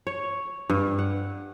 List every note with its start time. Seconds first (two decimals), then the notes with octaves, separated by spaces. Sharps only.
0.07 C#5
0.70 G2
0.98 F#5